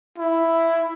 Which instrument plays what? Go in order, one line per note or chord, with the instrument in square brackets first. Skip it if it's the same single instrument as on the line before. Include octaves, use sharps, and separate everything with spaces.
[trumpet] E4